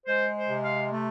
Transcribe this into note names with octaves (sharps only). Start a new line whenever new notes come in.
G#3 C5
C5
C3
F5
A3